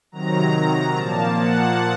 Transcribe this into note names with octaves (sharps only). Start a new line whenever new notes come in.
C3 D#3 F#3 A#5
A#2 F3 A#3 A5
F#5